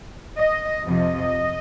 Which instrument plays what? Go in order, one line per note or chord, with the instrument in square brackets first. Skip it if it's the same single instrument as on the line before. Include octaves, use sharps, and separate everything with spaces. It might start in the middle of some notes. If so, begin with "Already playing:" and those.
[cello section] D#5
F2 C3 F3 D#5